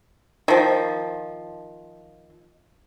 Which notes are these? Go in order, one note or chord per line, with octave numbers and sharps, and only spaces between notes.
D#3 F3